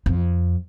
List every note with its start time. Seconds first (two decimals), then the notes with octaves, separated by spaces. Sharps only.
0.06 F2